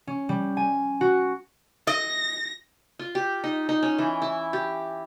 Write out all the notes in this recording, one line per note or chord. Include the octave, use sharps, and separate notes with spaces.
C#4
G3
G#5
F#4
D#5 A#6
F4
G4
D#4
D#4
C#4
E3
E4
G4